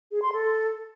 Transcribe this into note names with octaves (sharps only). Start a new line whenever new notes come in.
G#4
C6
A4